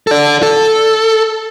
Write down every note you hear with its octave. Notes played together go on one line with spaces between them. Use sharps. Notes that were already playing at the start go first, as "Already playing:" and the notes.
A4 D5
A4